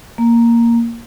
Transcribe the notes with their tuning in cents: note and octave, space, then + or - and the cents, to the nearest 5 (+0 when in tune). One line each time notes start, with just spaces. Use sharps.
A#3 +0